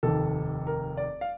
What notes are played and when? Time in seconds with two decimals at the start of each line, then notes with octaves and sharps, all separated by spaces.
0.03 F1 D#2 D#3 A4
0.67 A#4
0.97 D5
1.21 F5